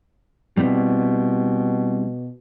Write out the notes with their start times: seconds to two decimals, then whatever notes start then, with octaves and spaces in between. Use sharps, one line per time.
0.57 B2 G3 C4 E4